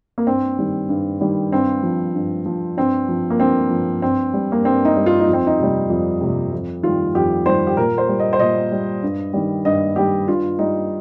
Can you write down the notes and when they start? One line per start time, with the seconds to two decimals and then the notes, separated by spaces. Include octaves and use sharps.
0.18 A#3
0.27 G2 C4
0.59 D#3 G3
0.89 G2
1.21 D#3 G3
1.52 G2 C4
1.83 F3
2.14 G2
2.46 F3
2.77 G2 C4
3.09 F3
3.30 A#3
3.40 G2 C4
3.70 F3
4.02 G2 C4
4.33 G3
4.52 A#3
4.64 G2 C4
4.85 D#4
4.96 G3
5.06 F4
5.20 D#4
5.28 F2
5.33 C4
5.47 D#4
5.59 C3 G3
5.90 F2
6.21 C3 G3
6.53 F2
6.83 D#3 G3 F4
7.15 F2 G4
7.46 D#3 G3 C5
7.67 G4
7.77 A#2 A#4
7.98 C5
8.08 G3
8.20 D#5
8.33 C5
8.39 A#2 D#5
8.72 G3
9.03 G2
9.33 D#3 G3
9.65 G2 D#5
9.96 D#3 G3 G4
10.28 G2 F4
10.59 G3 D#4